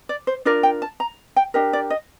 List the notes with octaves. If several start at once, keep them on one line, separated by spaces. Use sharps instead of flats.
D5
C5
D4 F4 A#4 D5
G5
A5
A#5
G5
D4 G4 A#4 D#5
D5
D#5